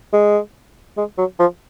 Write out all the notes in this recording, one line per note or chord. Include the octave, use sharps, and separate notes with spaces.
G#3
G#3
F#3
F3